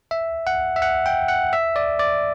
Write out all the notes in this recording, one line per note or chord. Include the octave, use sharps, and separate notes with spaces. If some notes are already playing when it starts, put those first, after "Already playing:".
E5
F#5
E5
F#5
G5
F#5
E5
D5
D5